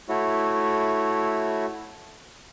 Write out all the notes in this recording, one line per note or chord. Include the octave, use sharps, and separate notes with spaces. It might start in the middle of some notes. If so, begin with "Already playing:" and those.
A3 E4 F#4 C#5